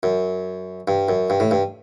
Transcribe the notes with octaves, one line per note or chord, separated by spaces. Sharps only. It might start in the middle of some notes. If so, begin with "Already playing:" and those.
F#2
G2
F#2
G2
A2
G2